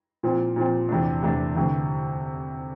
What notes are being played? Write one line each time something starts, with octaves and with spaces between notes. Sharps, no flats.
A#2 F3 C4
A#2 F3 C4
E2 C3 E3 A3 D4
E2 C3 E3 A3 D4
D2 C3 E3 A3 D4